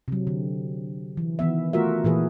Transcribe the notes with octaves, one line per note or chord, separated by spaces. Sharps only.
C3 F#3
D3
E3
D#3 E3 B3 E5
A3 F4 F#4 A#4 E5
A#2 E3 G#4 B4